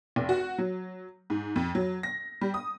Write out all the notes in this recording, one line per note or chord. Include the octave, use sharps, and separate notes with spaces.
F1
F#4
F#3
G#2
F2
F#3
A#6
G3
D#6